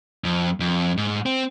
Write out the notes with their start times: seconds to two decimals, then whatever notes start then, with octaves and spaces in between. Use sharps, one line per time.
0.24 F2
0.60 F2
0.97 G#2
1.26 C4